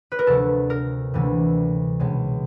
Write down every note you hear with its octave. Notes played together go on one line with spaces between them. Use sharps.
B4
A#4
D2 C3 F3 A4
A#4
D2 C3 E3 G3 A#3
C#2 B2 G#3